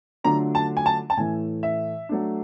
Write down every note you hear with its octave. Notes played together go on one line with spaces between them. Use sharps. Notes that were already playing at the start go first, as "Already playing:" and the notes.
D3 F#3 A3 D4 F4 A#5
A5
G#5
A5
A5
A2 E3 A3 G#5
E5
F#3 A3 D4